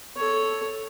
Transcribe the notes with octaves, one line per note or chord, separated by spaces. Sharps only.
A4 C#5